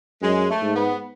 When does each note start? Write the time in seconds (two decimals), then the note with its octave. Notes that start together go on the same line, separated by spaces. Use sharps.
0.22 F#2 G#3
0.49 A3
0.62 G#2
0.75 B3